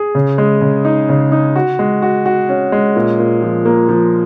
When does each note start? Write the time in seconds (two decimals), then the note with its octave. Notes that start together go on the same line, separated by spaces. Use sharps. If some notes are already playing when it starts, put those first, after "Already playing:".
Already playing: G#4
0.15 C#3
0.38 G#3
0.61 C#3
0.85 D#4
1.09 C#3
1.32 D#4
1.56 F#4
1.79 G#3
2.02 F#4
2.26 F#4
2.49 C#4
2.72 G#3
2.96 A#2
3.19 A#2
3.42 F3
3.66 A#3
3.89 F3